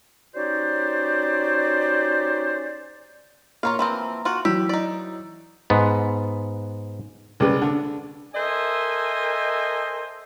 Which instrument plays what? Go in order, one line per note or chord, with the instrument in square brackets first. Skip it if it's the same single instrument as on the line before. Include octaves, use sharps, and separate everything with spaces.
[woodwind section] C#4 D#4 F#4 G4 C5 D5
[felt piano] A#3 A#5 [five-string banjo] F4 C#5 F5
[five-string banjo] E3 F3 C4
F4 F#4
[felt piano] E3 F#3 E6 [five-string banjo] G4
[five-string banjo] D#4 D5
[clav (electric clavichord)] G#2 B3
[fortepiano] C2 C#3 G#3 B4
D3
[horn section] A4 A#4 C5 D#5 E5 G#5